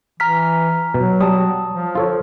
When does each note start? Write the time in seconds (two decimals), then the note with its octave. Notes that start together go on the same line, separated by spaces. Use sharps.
0.20 E3 A#5 F6 B6
0.94 B2 F#3
1.20 G3 A5 D#6
1.72 F3
1.95 F4 A4 C#5